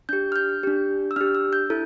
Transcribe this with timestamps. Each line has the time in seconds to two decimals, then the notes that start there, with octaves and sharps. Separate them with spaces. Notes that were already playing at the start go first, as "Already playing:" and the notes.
0.09 D4 G4 G6
0.32 F6
0.36 G6
0.63 D4 G4
1.11 E6
1.16 D4 G4 F6
1.35 E6
1.53 G6
1.70 E4 A4